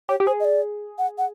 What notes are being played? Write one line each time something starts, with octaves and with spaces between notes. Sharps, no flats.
G4 C#5
G4
G#4 C5
D#5
D5
F#5
F#5